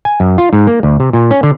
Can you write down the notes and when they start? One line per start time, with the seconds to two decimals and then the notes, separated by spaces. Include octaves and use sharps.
0.05 G#5
0.20 F#2
0.38 F4
0.53 G#2
0.67 A#3
0.83 D2
1.00 C3
1.13 A#2
1.31 C#4
1.43 D3